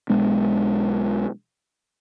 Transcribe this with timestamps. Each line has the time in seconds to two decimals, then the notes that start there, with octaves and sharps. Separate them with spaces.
0.09 B1 G#3 B3 D4